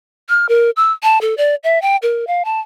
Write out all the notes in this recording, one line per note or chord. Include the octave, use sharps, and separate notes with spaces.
F6
A#4
E6
A5
A4
D5
E5
G5
A#4
F5
A5